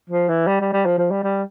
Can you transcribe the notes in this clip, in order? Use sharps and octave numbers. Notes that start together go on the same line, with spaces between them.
F3
E3
G3
G3
G3
F3
F3
G3
G3